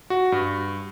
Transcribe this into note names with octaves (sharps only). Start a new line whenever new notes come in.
F#4
G2